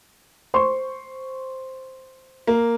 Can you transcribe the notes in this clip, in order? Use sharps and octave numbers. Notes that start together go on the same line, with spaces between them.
C5 C6 C#6
A#3